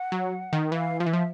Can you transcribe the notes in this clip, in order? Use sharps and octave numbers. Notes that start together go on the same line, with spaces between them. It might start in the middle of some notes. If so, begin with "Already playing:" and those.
Already playing: F#5
F#3
D#3
E3 F5
F3 F5
E3 E5
F3